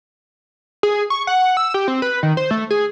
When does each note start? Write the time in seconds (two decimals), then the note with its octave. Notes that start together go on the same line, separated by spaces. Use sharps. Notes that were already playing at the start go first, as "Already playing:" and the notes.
0.83 G#4
1.10 C#6
1.27 F#5
1.57 E6
1.74 G4
1.88 C4
2.02 B4
2.23 D#3
2.37 C5
2.51 A3
2.70 G#4